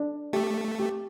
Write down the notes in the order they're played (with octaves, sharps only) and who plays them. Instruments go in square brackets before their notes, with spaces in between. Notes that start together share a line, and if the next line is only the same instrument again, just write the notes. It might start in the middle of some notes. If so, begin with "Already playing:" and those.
Already playing: [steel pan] D4
[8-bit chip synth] A3 [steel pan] G4
[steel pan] G4